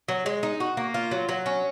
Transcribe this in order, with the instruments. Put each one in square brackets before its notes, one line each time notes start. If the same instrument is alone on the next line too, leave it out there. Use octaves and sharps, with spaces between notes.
[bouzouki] F#3
G#3
D#4
F#4
A#3
F4
F#3
F#3
C#4